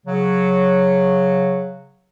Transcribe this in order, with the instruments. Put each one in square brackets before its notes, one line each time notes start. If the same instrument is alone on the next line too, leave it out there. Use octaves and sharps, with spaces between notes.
[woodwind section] C#3 F#3